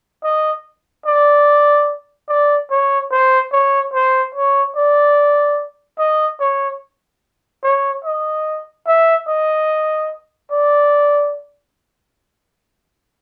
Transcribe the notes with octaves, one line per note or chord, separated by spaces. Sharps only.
D#5
D5
D5
C#5
C5
C#5
C5
C#5
D5
D#5
C#5
C#5
D#5
E5
D#5
D5